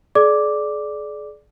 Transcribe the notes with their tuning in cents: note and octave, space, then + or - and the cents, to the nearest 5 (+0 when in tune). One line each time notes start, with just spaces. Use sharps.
G#4 +40 D5 +0 D6 +0